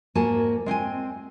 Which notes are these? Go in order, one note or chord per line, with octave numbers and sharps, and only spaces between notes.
G#2 A#3 F#4 G#5 A5
G#3 C4 G5 G#5